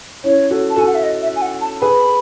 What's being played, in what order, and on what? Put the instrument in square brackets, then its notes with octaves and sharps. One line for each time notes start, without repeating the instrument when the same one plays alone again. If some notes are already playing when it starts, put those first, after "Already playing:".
[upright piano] C#4 E4 [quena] C#5
[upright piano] F#4 A4
[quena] A5
[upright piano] F#4 A4 [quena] G#5
[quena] F#5
E5
D#5
E5
G#5
F#5
A5
[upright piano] G#4 B4 [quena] B5